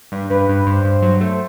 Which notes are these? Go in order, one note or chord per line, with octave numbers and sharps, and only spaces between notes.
G2
G2 B4
G2
G2 C5
G2
F#3
A3